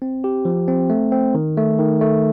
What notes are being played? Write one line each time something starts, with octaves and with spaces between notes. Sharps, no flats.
C4
G4
F3
C4
A3
C4
D#3
A3
D#3
A3